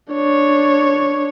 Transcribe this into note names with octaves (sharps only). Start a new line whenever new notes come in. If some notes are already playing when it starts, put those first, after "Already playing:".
D4 C#5